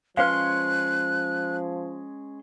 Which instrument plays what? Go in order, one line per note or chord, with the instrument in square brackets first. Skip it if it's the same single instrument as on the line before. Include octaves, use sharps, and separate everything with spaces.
[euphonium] F3 [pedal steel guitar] G#3 C#4 C6 [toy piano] B4 C5 F5 [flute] F#6